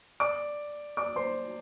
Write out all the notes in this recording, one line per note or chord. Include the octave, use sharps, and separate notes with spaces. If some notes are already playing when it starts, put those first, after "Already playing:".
D5 D6
D5 D6
C5 C6